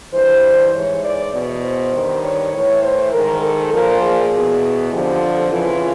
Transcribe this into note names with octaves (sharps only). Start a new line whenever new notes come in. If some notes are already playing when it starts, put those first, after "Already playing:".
G2 E3 C5
G#2 E3 C#5
D5
E2 B2
C5
G2 D#3
C#5
A2 E3 C#5
C5
G#2 D#3 A#4
A4
A#2 F3 A#4
G#4
E2 B2
F2 D3 F3 G4
F2 C#3 E3 F4